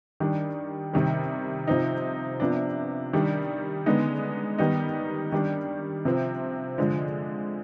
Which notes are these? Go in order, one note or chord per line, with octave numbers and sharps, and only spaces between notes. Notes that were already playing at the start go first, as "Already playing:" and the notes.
D#3 G3 D4
C3 D#3 G3
C3 F3 C4 D#4
C3 F3 B3 D4
D#3 G3 D4
D3 G#3 B3 D#4
D#3 G3 B3 D#4
D#3 G3 D4
C3 F3 C4
D3 F3 G#3